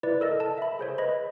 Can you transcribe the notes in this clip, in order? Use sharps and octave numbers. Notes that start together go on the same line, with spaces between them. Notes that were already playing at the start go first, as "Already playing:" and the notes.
E4 B4 D5
A4 A#4 D#5
A5
E5 B5
G#4 C5 C#5
B4 D#5 B5